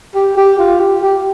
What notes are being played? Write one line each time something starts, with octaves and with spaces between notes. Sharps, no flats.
G4
G4
F4
G4
G4